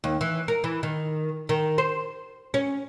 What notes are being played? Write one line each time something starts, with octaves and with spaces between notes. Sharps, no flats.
D#2
E3
A#4
E3
D#3
D#3
C5
C#4